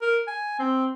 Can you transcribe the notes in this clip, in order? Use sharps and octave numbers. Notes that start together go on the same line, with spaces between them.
A#4
G#5
C4